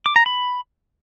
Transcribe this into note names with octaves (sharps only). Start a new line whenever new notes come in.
D6
A#5
B5